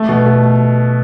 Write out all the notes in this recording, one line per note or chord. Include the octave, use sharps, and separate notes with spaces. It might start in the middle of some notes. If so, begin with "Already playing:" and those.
Already playing: A3
B2
A3